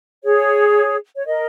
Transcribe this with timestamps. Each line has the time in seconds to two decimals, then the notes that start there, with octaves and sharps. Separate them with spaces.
0.24 G#4 C#5
1.16 C#5
1.26 A#4 D#5